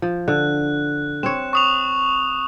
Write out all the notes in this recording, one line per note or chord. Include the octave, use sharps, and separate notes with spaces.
F3
D3 F#6
C4 C#5 E7
C#6 D#6 F7